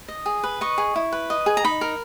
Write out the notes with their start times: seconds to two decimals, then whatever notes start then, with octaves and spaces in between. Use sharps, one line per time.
0.08 D#5
0.26 G#4
0.43 B4
0.61 D#5 C#6
0.78 G#4
0.96 E4
1.12 B4
1.30 D#5
1.46 G#4
1.57 A#5
1.64 D#4 B5
1.81 A#4